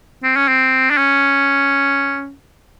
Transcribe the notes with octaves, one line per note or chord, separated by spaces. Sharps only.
C4
C#4
C4
D4
C#4